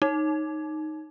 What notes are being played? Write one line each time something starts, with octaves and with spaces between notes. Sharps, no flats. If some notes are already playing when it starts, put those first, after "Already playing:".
D#4